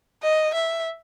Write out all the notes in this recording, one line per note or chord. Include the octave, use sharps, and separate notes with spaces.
D#5
E5